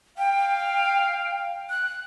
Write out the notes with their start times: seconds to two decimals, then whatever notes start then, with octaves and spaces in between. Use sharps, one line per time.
0.18 F5 G5
1.70 F#6